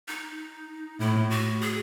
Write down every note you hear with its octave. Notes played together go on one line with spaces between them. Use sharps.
D#4
A2 E4
F#4
G#4